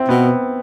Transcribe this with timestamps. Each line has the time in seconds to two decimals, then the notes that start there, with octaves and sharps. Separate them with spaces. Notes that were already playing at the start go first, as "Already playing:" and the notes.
Already playing: C4 E4
0.08 B2 B3